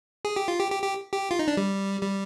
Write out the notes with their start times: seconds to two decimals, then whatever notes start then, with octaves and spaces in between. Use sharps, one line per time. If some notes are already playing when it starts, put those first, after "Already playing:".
0.25 G#4
0.36 G4
0.48 F4
0.59 G4
0.72 G4
0.83 G4
1.13 G4
1.31 F4
1.39 D#4
1.48 D4
1.57 G3
2.02 G3